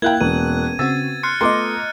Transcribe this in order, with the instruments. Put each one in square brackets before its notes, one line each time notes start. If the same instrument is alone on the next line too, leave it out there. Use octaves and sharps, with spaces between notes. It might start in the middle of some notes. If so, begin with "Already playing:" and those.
[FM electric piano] A#3 F#6 [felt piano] E4 F5 G5 [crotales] G#6
[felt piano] E1 [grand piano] B3 C#4 [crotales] D#7
[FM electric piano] C#3 C4 F#4 [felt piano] E6 [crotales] A6
[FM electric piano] C6 [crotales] F6 F#6 C#7
[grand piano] A3 B3 F4 [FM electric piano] D#5 A#5 [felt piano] C6 D6